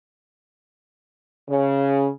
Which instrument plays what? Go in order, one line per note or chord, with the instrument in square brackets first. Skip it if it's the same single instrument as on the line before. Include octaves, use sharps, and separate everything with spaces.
[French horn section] C#3